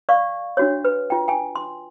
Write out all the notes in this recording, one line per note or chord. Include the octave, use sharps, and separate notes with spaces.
D5 F5 C#6
D4 F#4 C#5
B4
F4 G5
G5 G#5
C6